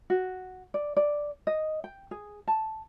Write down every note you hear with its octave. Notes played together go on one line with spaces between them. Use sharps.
F#4
D5
D5
D#5
G5
G#4
A5